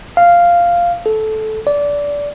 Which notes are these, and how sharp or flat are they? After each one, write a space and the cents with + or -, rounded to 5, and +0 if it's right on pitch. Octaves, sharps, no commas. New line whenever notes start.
F5 -5
A4 -15
D5 -20